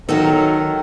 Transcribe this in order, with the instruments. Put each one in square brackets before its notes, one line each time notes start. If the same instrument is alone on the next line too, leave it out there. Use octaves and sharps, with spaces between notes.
[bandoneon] D#3 [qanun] F#3 D#4 [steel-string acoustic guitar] A4 A#4 F#5